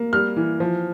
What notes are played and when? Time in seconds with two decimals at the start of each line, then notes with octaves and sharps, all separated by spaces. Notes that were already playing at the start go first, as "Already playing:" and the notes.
Already playing: A#3
0.13 G3 F6
0.36 E3
0.60 F3